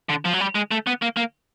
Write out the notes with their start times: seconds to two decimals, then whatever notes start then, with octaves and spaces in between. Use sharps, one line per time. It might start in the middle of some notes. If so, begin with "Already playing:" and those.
0.09 D3
0.25 F3
0.33 F#3
0.40 G3
0.55 G#3
0.71 A3
0.87 B3
1.02 A#3
1.17 A#3